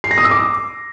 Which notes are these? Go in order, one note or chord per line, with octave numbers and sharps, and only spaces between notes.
C7
A#6
D#6
E6
D6